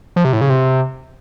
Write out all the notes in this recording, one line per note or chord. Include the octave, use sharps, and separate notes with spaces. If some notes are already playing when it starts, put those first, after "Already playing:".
F3
C3
A2
C#3
C3